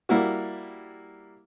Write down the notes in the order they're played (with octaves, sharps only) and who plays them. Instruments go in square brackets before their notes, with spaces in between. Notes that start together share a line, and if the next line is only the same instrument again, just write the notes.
[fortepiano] G3 A#3 E4 F#4